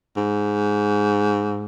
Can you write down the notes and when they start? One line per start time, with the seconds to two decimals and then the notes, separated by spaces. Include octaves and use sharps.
0.16 G#2